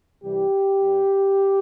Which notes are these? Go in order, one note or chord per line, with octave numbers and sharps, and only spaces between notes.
C2 C3 E3 G3 G4
G2 G3